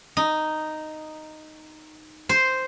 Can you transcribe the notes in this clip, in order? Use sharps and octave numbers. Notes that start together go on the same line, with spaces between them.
D#4
C5